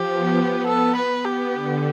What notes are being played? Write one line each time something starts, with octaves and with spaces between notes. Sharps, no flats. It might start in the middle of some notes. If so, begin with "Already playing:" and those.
Already playing: F3 G4
B3
A4
B4
B3 G4
D3